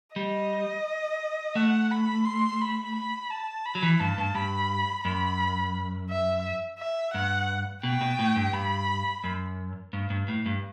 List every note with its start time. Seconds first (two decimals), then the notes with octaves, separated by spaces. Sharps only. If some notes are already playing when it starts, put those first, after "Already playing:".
0.16 G3 D#5
1.55 A3 F#5
1.91 B5
2.25 C6
2.61 B5
2.96 B5
3.31 A5
3.66 B5
3.75 F#3
3.83 E3
4.00 G2 A5
4.18 G2
4.35 G2 B5
5.05 F#2 B5
6.10 E5
6.79 E5
7.14 G2 F#5
7.83 B2 G5
8.01 B2
8.19 A2
8.36 G2
8.53 G2 B5
9.24 F#2
9.93 G2
10.10 G2
10.28 A2
10.46 G2